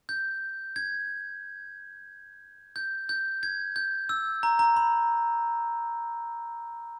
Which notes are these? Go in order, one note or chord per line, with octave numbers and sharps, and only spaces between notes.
G6
G#6
G6
G6
G#6
G6
E6
A#5
A#5
B5